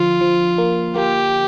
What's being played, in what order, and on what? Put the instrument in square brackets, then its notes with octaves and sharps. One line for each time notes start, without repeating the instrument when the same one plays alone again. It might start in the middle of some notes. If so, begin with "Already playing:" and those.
Already playing: [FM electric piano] D3 F3 [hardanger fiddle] F4
[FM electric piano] F3
A#3
[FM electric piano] A#3 [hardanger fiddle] G4